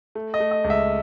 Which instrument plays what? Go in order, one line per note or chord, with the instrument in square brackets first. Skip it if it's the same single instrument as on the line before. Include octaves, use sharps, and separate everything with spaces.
[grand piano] A3
D#5
A3
D#5
C#2
E5